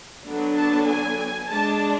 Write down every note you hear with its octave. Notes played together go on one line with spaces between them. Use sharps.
D3 F#3 B3 D4
A5
G#5
G#5
G#3 D4 A5